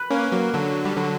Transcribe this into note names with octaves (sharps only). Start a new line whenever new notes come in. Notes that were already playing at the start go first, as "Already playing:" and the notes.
Already playing: B4
A#3 C#4
F#3 A#3
D3 F#3
G3
D3 F#3